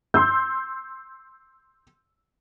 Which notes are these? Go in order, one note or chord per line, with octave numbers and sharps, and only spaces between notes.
C6 E6 G6